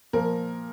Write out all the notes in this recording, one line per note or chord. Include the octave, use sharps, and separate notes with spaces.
A#2 F3 A#4